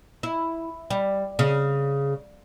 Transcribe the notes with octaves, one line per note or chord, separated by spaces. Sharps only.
E4
G3
C#3